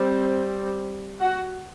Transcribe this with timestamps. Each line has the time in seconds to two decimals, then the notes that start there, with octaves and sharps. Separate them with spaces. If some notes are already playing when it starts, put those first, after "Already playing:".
Already playing: G3 C4
1.20 F#4 F#5